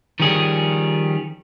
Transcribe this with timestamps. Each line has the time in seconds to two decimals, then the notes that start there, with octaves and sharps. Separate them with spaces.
0.20 D#3 F3 G3 C#4 G#4